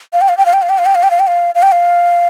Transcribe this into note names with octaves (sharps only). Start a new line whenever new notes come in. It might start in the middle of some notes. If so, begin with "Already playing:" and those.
F5
G5
F5
G5
F5
G5
F5
G5
F5
G5
F5
G5
F5
G5
F5
F5
G5
F5